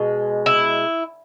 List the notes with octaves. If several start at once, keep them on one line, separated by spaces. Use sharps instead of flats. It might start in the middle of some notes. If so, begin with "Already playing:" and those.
Already playing: B2 G#3
E4